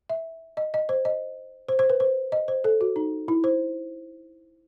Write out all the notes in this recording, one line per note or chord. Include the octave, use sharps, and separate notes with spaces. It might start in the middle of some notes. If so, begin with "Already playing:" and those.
E5
D#5
D#5
C5
D#5
C5
C5
B4
C5
D#5
C5
A4
F#4
D#4
E4
C5